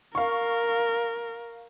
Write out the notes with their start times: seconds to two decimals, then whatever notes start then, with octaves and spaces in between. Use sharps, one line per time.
0.15 A#4 F5 C#6